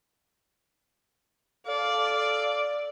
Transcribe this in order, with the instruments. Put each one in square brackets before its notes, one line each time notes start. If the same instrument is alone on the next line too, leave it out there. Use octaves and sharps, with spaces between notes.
[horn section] A4 F5 [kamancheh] D5